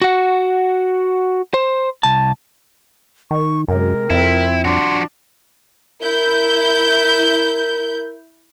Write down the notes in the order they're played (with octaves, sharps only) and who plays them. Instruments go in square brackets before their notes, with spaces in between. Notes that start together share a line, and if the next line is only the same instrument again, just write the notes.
[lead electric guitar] F#4 F#5
C5
C2 A5
[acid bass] D#3 [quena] C#6
[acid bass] F#2 [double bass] C3 G#3 [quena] A#4
[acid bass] F2 [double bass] C4 [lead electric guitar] E4
[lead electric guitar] F3 F#4 [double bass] D4 [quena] C6
[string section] E4 G6 [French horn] A#4